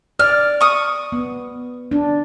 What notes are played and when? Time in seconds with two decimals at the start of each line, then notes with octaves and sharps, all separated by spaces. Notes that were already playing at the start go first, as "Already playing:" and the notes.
0.19 D5 F6
0.61 C#6 D#6
1.12 B3
1.91 D4